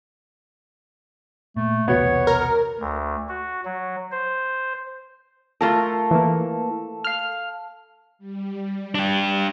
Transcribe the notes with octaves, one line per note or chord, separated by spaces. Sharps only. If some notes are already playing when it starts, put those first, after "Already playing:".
A#2 A3
B1 E2 C3 B3 F#4 C#5
A#4
D2
F#4
F#3
C5
A3 F4 A4 A#4
E3 A#3
F5 F6
G3
D4 G4